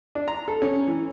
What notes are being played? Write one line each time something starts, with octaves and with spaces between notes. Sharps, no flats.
D4
A#5
A4
C#4
E3